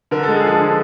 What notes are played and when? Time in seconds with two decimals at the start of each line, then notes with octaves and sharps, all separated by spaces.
0.11 D3 A#4
0.23 G#3 A4
0.35 G#4
0.44 F3 A4
0.60 D3